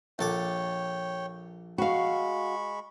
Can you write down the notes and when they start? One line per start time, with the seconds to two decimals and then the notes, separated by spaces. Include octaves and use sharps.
0.19 A#1 A4 C#5 G5 D6
1.78 G#3 F#4 F5 B5 C#6